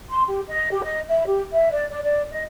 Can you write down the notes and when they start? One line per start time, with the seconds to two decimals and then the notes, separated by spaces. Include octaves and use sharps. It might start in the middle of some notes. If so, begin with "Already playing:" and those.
0.09 C6
0.28 G4
0.47 D#5
0.71 G4
0.84 D#5
1.08 E5
1.25 G4
1.52 E5
1.71 D5
1.91 D5
2.03 D5
2.31 D#5